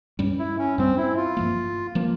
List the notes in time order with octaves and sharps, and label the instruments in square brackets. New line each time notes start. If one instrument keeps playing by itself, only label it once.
[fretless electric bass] G2 G3 C#4
[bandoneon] E4
C#4
[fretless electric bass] G2 G3 C#4 [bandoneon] C4
[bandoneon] E4
F4
[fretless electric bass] G2 F3 A#3
F3 A#3